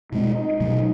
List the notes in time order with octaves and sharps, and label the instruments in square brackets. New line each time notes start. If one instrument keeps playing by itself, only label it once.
[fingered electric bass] B2 G#3 C4 [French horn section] D#4
[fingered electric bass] B2 F#3 A3